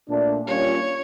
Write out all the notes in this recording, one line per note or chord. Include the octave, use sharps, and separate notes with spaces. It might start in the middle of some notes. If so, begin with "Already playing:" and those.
A#2 A3 D4
G3 A#3 C#4 F4 C#5